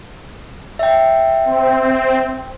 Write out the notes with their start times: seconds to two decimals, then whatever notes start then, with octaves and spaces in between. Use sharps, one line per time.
0.79 E5 G5
1.44 C4